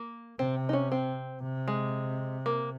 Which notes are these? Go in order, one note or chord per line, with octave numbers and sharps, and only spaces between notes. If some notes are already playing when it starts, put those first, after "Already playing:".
Already playing: A#3
C3 C4
D#4
C#4
C4
C3
G#3
A#3